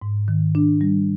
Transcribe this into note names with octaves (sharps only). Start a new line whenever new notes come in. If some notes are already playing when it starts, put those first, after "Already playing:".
G#2
D#3
D4
G3